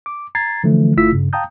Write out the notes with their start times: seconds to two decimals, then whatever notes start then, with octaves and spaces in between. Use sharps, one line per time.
0.06 D6
0.35 A#5 G#6 A6 C7
0.64 D3 E3 F3 A3
0.97 G1 A3 E4 F4 E6 B6
1.12 G2 C#3
1.33 F5 G5 A5 A#5 D#6 G6